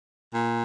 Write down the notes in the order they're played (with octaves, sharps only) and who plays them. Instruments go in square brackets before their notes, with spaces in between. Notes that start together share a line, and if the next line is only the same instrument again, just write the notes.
[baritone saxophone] A#2